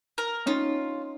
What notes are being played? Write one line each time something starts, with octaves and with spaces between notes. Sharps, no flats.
A#4
C#4 D#4 F4